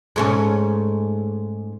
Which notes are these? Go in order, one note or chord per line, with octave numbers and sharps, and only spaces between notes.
G#2 A3 C#4